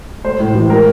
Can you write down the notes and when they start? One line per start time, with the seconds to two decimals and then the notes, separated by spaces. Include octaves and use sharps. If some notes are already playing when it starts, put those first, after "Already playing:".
0.24 A3 C5
0.40 A2
0.55 E3
0.70 G3 A#4